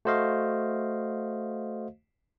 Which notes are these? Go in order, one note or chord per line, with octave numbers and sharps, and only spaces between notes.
A3 F#4 C5 D#5 F5